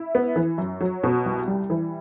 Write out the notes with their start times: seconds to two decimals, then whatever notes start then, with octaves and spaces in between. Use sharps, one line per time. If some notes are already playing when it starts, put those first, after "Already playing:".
Already playing: E4
0.15 B3
0.36 E3
0.58 F#2
0.81 F#3
1.04 B2
1.25 C2
1.48 G3
1.70 E3